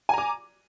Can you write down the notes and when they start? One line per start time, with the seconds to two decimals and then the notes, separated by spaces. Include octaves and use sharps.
0.09 G#5
0.14 A#5
0.18 D6